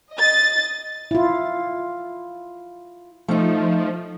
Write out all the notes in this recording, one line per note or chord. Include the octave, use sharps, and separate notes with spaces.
D#5 A6
E4 F4
F3 A3 D#4